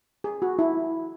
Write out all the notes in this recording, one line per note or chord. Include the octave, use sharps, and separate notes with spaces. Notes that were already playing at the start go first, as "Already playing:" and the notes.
G#4
F#4
E4